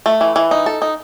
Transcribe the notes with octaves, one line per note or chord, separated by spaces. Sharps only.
A3
E3
E3
D#4
A4
D#4